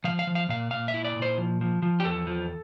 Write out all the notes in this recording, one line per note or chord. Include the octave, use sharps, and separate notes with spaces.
F3 F5
F5
F3
F5
A#2 F5
A#2 F5
E5
E4
D5
A#2
C5
F3
F3
F3
G4
E2 A4
F3